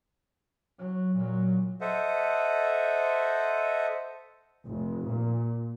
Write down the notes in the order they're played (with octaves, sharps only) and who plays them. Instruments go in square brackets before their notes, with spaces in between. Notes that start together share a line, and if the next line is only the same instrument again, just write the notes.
[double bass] F#3
A#2 F#3
[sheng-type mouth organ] A4 C5 D#5 E5 F#5
[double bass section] F1
A#2